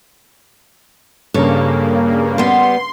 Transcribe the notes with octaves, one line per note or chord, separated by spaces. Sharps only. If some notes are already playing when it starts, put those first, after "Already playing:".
G2 C#3 A#3 A4 C#5
G3 B3 C6